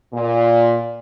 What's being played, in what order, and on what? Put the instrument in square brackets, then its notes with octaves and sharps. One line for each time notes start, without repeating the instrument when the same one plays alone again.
[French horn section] A#2